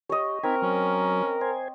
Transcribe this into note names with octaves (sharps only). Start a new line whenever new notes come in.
G4 C#5 D#5
C4 D#4 A#4 G#5 B5
F#3 C#4
C5 G#5